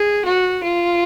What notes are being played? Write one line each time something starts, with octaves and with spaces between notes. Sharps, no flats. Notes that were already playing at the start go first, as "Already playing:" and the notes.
Already playing: G#4
F#4
F4